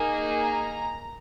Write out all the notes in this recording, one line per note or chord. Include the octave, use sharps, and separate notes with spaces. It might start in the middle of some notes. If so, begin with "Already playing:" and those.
Already playing: A#3 D#4 G#4
A#5